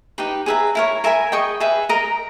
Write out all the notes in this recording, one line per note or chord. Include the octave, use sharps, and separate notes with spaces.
D#4 G4 B4 G5
G#4 B4 E5 A#5
E4 A#4 C#5
A#4 E5 G#5 B5
G#4 D#5 G5 C#6
G#4 B4 E5
A#4 D#5 A#5